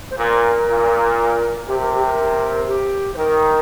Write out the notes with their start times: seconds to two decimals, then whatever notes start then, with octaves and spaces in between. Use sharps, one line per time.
0.11 C5
0.18 A#2 A#4
0.67 A#2
1.67 C3 G4
1.81 A#4
1.93 G4
2.05 A#4
2.67 G4
3.14 C5
3.17 D#3 A#4